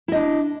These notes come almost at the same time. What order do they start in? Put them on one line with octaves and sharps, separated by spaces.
E4 D#5 D4